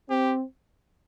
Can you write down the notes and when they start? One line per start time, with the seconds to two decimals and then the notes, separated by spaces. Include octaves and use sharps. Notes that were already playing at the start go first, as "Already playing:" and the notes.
0.10 C4 G4